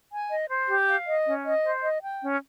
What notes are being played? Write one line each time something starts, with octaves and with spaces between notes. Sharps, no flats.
G#5
D#5
C5
G4
F5
D#5
C#4
D#5
C5
D#5
G5
C#4